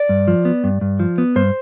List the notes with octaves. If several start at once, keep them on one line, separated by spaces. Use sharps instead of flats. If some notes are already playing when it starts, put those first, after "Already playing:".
Already playing: D5
G2
F3
B3
G2
G2
F3
B3
G2 C5